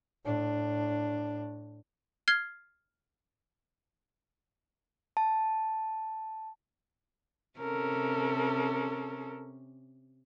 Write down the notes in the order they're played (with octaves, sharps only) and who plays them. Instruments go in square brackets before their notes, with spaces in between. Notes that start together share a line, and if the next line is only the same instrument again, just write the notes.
[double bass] A2 D4
[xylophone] F6 G#6 C7 G7
[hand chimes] A5
[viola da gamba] C3 C#4 [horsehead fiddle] A4 A#4